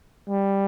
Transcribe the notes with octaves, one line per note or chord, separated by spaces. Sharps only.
G3